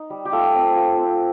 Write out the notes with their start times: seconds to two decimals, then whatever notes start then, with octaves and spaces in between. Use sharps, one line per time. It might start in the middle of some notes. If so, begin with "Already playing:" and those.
Already playing: D#4
0.10 G3
0.25 G4
0.32 A3 F4 A4
0.54 C4
0.76 F4
0.98 C4